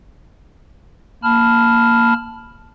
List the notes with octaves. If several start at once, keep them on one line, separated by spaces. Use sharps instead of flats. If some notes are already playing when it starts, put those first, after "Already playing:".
A#3 A5 B5 F6